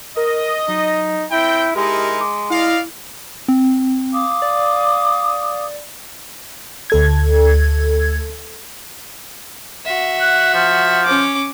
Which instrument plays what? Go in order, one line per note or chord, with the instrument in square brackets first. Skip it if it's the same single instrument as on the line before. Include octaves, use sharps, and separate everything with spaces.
[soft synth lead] A#4 [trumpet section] D#5
[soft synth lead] F#3 [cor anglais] D#4
[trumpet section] C4 G5 [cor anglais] E4 [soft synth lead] G6
[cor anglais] G#3 [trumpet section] D#4 E4 A#4 [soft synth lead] G4
[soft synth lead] D6
[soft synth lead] E4 [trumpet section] D5 D#5 F5
[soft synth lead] C4
[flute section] F5 D6 D#6
[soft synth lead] D5
[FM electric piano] D2 A4 G#6
[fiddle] F#4 E5
[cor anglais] F#5
F3
[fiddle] C#4 D6